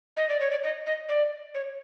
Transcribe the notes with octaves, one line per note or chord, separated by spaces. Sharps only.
D#5
D5
C#5
D5
D#5
D#5
D5
C#5